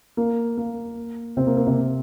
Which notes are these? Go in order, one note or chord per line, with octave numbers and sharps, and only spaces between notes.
A#3
A#3
C3 C4
A#3
A#3
C3 C4